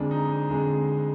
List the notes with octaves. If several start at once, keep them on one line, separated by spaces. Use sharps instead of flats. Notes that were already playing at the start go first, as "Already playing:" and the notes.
Already playing: F2 D3 G#3 D4
D#4
F2 D3 G#3